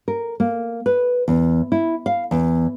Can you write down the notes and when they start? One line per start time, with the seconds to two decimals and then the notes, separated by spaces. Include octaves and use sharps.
0.08 A#4
0.40 A#3
0.86 B4
1.28 E2
1.72 E4
2.06 F5
2.31 E2